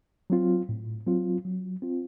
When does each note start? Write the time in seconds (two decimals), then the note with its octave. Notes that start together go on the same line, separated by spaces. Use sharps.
0.30 F#3 C4 F4
0.69 A2
1.06 F#3 C4 F4
1.45 F#3
1.82 C4 F4